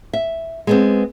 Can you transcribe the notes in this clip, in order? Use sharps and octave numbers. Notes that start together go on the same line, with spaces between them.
E5
G#3 B3 C4